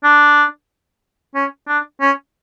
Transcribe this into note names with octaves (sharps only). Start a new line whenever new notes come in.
D4
C#4
D4
C#4